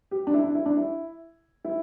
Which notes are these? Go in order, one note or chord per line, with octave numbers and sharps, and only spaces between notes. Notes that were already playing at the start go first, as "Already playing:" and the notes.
G4
D4
E4
D4
E4
D4
E4
E4